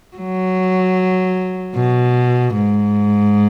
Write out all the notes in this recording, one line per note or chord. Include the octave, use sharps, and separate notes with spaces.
F#3
B2
G#2